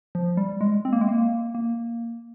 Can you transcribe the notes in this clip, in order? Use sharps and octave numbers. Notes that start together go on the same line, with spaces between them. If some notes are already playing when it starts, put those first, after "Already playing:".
F3
G3
G#3
C4
A#3
G#3
A#3
A#3